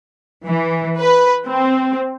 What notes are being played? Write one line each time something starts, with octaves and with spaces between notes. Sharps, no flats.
E3
B4
C4